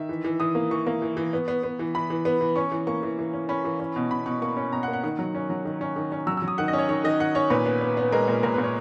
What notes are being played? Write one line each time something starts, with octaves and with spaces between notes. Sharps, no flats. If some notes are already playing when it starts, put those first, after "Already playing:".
Already playing: D#3 E5
E3
E3
E3 D#6
A#3
E3 C#6
A#3
E3
E3
B3
B3
B3
E3
E3 B5
E3
B3
E3
C#4 C#6
E3
A#3 C#6
E3
E3
C#4
C#4 B5
E3
C#4
B2
B2 B5
B2 C#6
A#3 C#6
C#4
B2 A#5
F#5
A#3
F#5
D#3 F#5
F#3
C#4
F#3
D#3
C#4
D#3
C#4
F#3 E6
E6
F#3
D#6
D#3 F#5
D#5
C#4
C#5
D#3 C#5
D#3 D#5
D#3 F#5
C#4 C#5
A#2 B4
B3
B3
B3
G#3 A#4
A#2
A#2 A#4
B4
A#2
C#5